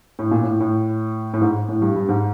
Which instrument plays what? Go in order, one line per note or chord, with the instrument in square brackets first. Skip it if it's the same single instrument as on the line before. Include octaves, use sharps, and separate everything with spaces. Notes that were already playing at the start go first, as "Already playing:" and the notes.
[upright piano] A2
A#2
A2
A2
A2
G#2
A2
G2
G2
G#2